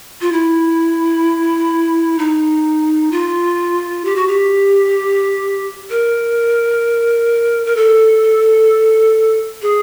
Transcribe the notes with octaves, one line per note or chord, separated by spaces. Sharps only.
F4
E4
D#4
F4
G4
F#4
G4
A#4
A#4
A4
G#4